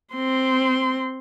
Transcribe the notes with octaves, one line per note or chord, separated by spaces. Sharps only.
C4 C6